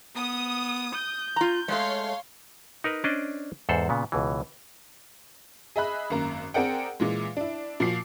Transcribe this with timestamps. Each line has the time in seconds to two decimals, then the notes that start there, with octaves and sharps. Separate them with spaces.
0.15 B3 D#6
0.95 G6
1.36 F4 A#5
1.68 G#3 A3 C#5 F5 C6
2.84 D#4 A#4 B4
3.04 C#4 D4 C5 D5 D#5
3.69 E2 G#2 A4 C5 F#5
3.89 A#2 C#3 B3
4.12 C#2 B2 E3
5.76 G#4 D#5 E5 B5 F#6
6.10 G#1 F#2 A#3 A#5
6.54 C4 G#4 A#4 D5 F#5 G5
7.00 A#2 E3 G#3
7.37 D4 E4
7.80 A#2 F3 F#4 C7